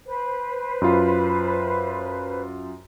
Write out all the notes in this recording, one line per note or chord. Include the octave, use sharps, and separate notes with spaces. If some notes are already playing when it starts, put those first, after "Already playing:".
B4 C5
F#2 F4